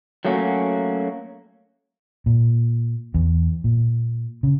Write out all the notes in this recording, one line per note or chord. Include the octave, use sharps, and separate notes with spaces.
F#3 A3 A#3 C#4 F#4
A#2
E2
A#2
C#3